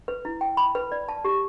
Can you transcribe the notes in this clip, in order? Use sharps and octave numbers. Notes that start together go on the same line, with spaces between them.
B4
E4
G5
B5
B4
D5
A5
G4